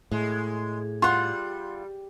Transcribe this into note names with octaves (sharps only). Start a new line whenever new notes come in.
A2 G#3
G3 F4 F#5 C6